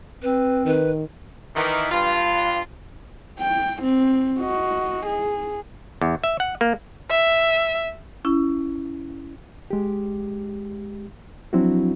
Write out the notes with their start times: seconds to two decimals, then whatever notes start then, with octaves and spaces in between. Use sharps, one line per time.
0.22 C4 B4
0.66 D#3 B4
1.55 D#3 E3
1.91 G2 F4
3.39 G5
3.82 C4
4.40 F#4 D#5
5.06 G#4
6.01 E2
6.24 E5
6.40 F#5
6.61 A#3
7.10 E5
8.25 C#4 E4
9.71 G#3 G4
11.53 F3 F#3 C4 D4 E4 F#4